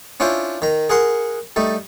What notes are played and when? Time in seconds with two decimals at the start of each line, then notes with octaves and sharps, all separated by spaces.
0.20 C#4 D4 E4 F4 C5
0.62 D#3 A#5
0.89 G#4 A#4 F#5 C6
1.56 G3 A3 D#4